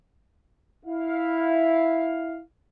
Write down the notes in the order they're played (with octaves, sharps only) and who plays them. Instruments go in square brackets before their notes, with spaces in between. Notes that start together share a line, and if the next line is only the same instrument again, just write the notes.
[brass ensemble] E4 F5